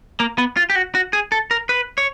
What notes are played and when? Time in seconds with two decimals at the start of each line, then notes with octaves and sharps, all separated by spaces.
0.20 A#3
0.38 B3
0.57 F4
0.70 G4
0.76 F#4
0.95 F#4
1.13 G#4
1.32 A4
1.51 A#4
1.69 B4
1.98 C#5